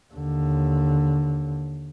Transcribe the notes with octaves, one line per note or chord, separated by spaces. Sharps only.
D#2 D3